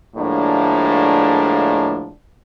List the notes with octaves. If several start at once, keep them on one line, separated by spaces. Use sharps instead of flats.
D2 A2 F3 G#3 A#3 D4